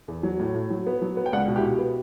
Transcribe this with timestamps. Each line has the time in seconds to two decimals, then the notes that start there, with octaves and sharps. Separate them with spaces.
0.08 E2
0.23 F#3
0.39 A2
0.55 A2
0.70 F#3
0.87 B3
1.02 F#3
1.17 B3
1.26 G5
1.33 C#2 D5 F#5
1.48 B2
1.56 E4 G4
1.63 B2
1.78 B3